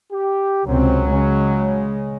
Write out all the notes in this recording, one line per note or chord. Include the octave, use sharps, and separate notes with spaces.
G4
C#2 C3 F#3 C4 C#4
C#3 G#3